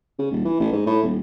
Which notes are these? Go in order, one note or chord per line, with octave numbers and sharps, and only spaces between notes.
C#3
D#1
E3
A1
G#2
A2
D#1